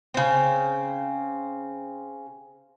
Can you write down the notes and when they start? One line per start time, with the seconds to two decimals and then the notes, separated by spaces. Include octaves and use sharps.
0.14 C#3 C4